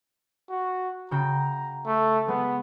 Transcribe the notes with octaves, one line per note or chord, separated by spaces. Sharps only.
F#4
C#3 F#4 G5 A#5
A3
G#3 B3